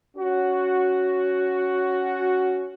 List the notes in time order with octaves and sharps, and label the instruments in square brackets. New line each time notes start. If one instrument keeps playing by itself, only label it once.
[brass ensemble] C#4 F#4